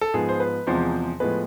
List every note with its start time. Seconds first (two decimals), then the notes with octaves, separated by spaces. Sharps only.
0.01 A4
0.14 G#2 F3 B3 G#4
0.29 C5
0.40 B4
0.67 E2 C3 F3 G#3 C5
1.20 A2 F3 G#3 B3 B4